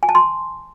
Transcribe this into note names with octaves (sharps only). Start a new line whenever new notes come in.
G#5
A5
C6